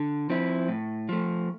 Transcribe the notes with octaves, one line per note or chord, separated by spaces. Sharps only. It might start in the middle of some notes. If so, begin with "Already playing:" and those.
Already playing: D3
F3 C4 E4
A2
F3 A3